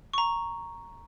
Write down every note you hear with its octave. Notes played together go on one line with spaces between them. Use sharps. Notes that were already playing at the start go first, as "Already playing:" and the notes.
A#5 C#6